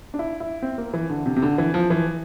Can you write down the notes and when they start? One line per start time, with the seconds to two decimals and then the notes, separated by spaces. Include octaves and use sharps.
0.14 D4
0.19 E4
0.40 E4
0.62 C4
0.78 A#3
0.94 E3
1.10 D3
1.26 C3
1.36 C3
1.43 D3
1.58 E3
1.74 F3
1.90 E3